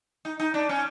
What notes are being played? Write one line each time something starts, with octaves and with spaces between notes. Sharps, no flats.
D#4
D#4
D4
C#4